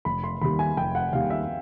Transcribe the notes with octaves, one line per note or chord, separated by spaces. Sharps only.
F1 B5
C6
D#2 D#3 G3 B5
G#5
F1 G5
F#5
D#2 D#3 G3 F5
E5